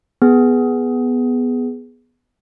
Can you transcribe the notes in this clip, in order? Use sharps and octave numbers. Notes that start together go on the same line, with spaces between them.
B3 G#4